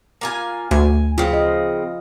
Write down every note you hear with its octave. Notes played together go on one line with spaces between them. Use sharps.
A#3 F4 G#5
D2 G#5
C#3 C4 F4
D#5